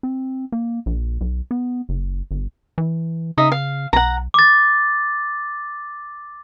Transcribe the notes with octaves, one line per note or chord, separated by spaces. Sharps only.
C4
A#3
A#1
B1
B3
F#1
G1
E3
C#3 D#4 D#5 E5
F5
B1 F#5 A#5
D6 A6